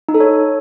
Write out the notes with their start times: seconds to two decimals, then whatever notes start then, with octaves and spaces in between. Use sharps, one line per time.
0.09 D#4
0.14 A4
0.20 C#5